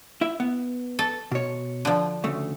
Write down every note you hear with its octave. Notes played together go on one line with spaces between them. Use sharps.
E4 E5
B3
A4
B2 C#5
D3 F3
D2 C#3 A3